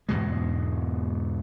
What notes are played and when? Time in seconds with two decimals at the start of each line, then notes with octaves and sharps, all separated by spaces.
0.09 E2 G#2 B2 G#3